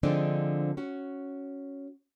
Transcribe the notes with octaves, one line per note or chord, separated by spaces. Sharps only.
D3 F3 G#3 C4 D4 D#4
C#4 F#4